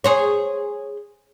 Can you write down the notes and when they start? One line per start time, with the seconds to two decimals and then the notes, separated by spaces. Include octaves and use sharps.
0.04 G#4 C5 C#5